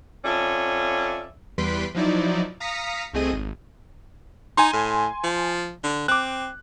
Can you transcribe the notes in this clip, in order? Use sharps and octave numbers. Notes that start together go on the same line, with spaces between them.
F2 C#4 D5 E5
E2 G3 B4 C6 B6 D7
F3 F#3 D#4 E4 D5
F5 A#5 D#6 A#6 B6 C#7
C2 A3 C4 G#4 D#5 D#7
G#1
D#4 G#5 C6
A2
F3
D3
C4 D6 F#6